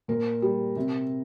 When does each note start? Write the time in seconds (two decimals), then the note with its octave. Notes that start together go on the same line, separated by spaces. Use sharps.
0.08 A#2 A#4
0.42 G3
0.76 C3